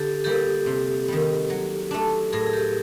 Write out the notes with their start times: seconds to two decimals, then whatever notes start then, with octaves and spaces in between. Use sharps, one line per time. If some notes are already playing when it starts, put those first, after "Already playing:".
Already playing: D3 G4 A4
0.24 G3 A#3 G4 A4
0.66 C3
1.08 D#3 G3
1.50 F#3
1.91 A3 D4
2.33 A2 G#4 A#4
2.46 G#4
2.53 G4 A4